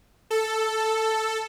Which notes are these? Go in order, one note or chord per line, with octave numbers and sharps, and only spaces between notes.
A4